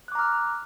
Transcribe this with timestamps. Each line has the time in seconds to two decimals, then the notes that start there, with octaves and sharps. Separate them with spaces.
0.08 F#6
0.12 D6
0.15 A#5
0.19 F6